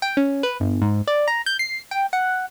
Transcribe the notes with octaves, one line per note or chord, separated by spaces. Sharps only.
G5
C#4
B4
G1
G#2
D5
A#5
G6
C7
G5
F#5